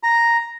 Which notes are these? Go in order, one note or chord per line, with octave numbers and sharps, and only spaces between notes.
A#5